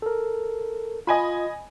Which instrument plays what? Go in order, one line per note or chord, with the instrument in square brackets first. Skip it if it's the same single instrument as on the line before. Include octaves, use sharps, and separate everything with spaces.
[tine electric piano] A4 A#4
[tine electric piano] F4 [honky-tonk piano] D#5 G#5 B5